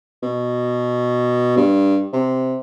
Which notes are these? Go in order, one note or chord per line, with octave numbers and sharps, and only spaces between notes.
B2
G2
C3